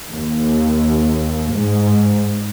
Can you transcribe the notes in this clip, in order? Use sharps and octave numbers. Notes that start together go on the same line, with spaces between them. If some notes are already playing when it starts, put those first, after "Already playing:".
D#2
G#2